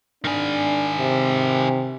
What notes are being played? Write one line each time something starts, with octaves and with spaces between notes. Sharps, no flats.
D#3 D4 G#4
C3